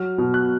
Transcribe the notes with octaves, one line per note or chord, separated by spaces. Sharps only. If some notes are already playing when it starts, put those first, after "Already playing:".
Already playing: F#3 F6
B2
F#6